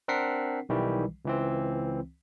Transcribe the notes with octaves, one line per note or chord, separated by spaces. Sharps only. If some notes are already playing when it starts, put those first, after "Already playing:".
C4 D4 A#4 F#5 B6 C7
B1 D#3 E3 G3
C#2 E3 C4